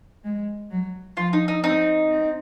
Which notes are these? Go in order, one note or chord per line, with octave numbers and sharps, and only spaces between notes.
G#3
F#3
F3 F4
D#4
D#4
C4 D#4
C4